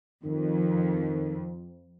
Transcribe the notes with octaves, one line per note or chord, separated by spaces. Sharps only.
F2 D#3